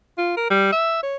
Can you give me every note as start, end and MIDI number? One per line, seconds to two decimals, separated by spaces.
0.18 0.36 65
0.37 0.47 70
0.50 0.71 55
0.72 1.00 76
1.03 1.17 73